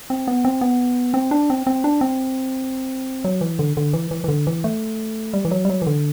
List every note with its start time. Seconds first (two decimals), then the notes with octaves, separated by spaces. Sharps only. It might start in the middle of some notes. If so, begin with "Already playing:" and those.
0.10 C4
0.28 B3
0.45 C4
0.61 B3
1.14 C4
1.31 D4
1.50 C4
1.67 C4
1.84 D4
2.01 C4
3.24 F#3
3.41 E3
3.59 D3
3.77 D3
3.93 E3
4.11 E3
4.24 E3
4.28 D3
4.47 E3
4.64 A3
5.34 G3
5.45 E3
5.51 F#3
5.65 G3
5.69 F#3
5.82 E3
5.87 D3